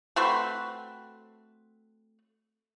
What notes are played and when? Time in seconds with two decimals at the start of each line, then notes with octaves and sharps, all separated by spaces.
0.16 A3 C4 F#4 B4